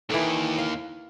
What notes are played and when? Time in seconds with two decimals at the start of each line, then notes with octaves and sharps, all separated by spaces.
0.10 D#2 D#3 E3 A4
0.58 F5